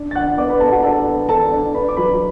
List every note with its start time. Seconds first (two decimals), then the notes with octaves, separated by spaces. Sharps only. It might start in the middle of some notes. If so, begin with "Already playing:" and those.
Already playing: D4
0.11 A6
0.15 D4 F#5 F#6
0.38 B3 D5 D6
0.49 B4 B5
0.60 B3 A4 A5
0.72 F#4 F#5
0.83 D4 A4 A5
1.06 B3
1.28 D4 A4 A5
1.51 D4
1.74 D4 B4 B5
1.88 D6
1.97 F#3 B4 B5